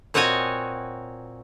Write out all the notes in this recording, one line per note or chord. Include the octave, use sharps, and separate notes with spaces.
A#2 C4 F#4 C#5 D#5 G#5